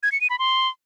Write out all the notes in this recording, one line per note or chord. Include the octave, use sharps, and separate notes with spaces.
G#6
C#7
D#7
B5
C6